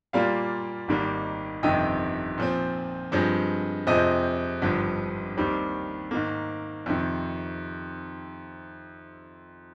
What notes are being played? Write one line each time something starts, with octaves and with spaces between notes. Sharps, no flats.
A#2 G3 A#3 F4 D5 F5
G#1 G#2 D#3 G3 A#3
G1 F2 C3 D#3 D#5 G5
A#2 F3 C4
G2 F3 G#3 C4
F2 C3 F3 G#3 C5 D#5
G#1 G2 D3 F3
D#2 D#3 G3 C4
G#2 D#3 A#3
F2 C3 D#3